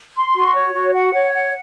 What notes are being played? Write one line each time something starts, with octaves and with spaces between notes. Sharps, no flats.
C6
F#4
C#5
F#4
F#5
C#5
F#5